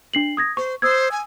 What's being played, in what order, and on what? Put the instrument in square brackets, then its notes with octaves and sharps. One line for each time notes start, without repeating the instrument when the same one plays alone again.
[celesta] D4 C7 F#7
D#6 G#6 A#6
[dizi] C5 [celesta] C#6
[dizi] C5 [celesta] D#6 E6 G#6
[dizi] G#5